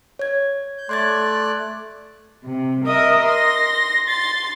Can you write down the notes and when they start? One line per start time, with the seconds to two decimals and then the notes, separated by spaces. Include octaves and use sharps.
0.19 C#5 G#6
0.78 G6
0.89 A3 D5 C6 F#6 G#6 A6
2.43 C3
2.85 A#4 D#5 E5 D#6
3.24 C6 A#6
4.07 C6 A6